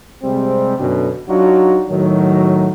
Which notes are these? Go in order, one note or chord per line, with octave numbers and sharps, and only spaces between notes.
C3 G3 G#3 C4
F#2 B2 D3
F#3 D4 D#4 F4 F#4
A2 D#3 F#3